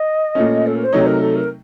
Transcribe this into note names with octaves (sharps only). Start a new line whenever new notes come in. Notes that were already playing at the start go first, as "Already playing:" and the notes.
Already playing: D#5
A#2 A3 C#4
A4
A#4
C5
C3 F#3 A3 D#4 C#5
A#4
A4
A#4